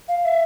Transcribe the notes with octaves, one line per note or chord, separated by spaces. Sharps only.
F5
E5